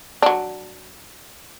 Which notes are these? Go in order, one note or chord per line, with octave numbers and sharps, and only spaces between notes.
F#3 D4